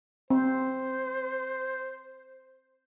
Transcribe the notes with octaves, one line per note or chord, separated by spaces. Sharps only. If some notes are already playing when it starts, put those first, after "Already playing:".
C4 C5